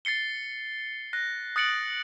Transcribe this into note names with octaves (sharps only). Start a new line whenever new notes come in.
A6 C7 C#7 G7
F#6 A#6
D#6 F#6 A6 C#7 D7 F#7